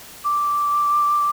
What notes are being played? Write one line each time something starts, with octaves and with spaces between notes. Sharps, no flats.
D6